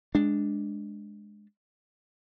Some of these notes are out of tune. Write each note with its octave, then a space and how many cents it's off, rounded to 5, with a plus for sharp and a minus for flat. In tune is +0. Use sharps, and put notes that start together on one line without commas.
G#3 +0 D4 +0